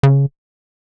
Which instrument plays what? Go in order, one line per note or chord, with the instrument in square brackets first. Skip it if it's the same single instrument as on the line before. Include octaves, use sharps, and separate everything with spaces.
[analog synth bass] C#3